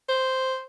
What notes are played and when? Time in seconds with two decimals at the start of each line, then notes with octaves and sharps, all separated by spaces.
0.09 C5